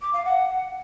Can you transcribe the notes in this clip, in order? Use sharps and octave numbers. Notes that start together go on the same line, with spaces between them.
D6
F5
F#5